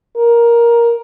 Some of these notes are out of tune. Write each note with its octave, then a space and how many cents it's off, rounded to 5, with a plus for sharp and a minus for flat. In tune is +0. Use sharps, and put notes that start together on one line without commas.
A#4 +10